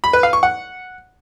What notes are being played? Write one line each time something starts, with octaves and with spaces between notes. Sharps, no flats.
B5
B4
F5
C#6
F#5